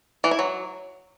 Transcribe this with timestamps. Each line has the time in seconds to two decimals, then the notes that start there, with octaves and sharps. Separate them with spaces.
0.24 E3
0.31 E4
0.39 F#3